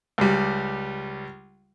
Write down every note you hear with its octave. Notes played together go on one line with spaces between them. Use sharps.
C#2 G3